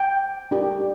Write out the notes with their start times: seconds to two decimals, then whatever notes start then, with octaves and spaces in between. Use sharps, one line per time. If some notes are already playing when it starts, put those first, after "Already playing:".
Already playing: G5
0.51 D4 G4 A#4